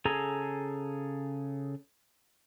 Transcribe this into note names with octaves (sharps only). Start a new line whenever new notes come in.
C#3 G#4 A4 G#5 A#5